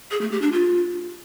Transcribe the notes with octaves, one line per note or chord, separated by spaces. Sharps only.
G#4
A3
G4
D4
F4